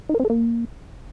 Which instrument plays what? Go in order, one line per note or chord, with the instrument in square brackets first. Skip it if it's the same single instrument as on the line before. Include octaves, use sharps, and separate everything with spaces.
[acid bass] D#4
A#4
C4
A4
A#3